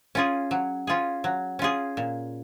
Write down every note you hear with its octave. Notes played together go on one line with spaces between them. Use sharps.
C#4 F4 G#4
F#3
C#4 F4 G#4
F#3
C#4 F4 G#4
A#2